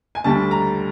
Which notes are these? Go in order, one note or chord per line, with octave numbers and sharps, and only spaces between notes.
G#5
D2 D3 G3 A5
A#5